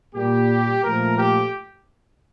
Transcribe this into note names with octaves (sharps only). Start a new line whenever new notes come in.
A#2 G3 A#3 G4
A#2 F3 A3 A#4
G4